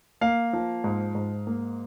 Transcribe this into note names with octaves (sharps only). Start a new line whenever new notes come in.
A#3 F5
F3
G#2
G#2
A#3